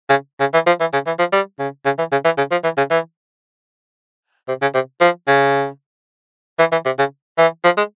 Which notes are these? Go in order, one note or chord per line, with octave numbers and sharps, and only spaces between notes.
C#3
C#3
E3
F3
E3
C#3
E3
F3
G3
C#3
C#3
E3
C#3
E3
C#3
F3
E3
C#3
E3
C3
C#3
C3
F3
C#3
E3
E3
C3
C#3
E3
F3
G#3